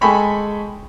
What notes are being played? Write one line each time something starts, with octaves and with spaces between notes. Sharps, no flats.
G#3 A4 G5 G#5 B5 C#6